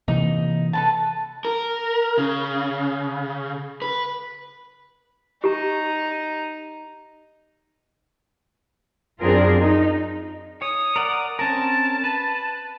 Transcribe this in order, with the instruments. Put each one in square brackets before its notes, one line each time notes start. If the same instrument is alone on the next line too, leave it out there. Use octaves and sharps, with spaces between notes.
[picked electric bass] C3 E3 A#3 [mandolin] D#4
[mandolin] A4 B4 A5
[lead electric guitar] A#4
C#3
B4
[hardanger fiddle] D#4 [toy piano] G4 A#5
[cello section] F#2 C4 D4 F4 G#4 A#4
D#4
[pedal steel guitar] C#5 [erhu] D#6
[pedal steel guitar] A#4 D5 F#5
[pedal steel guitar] C4 C#4 A#4 [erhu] A5
[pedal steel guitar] B4